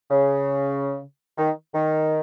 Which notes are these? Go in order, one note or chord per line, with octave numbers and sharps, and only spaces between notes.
C#3
D#3
D#3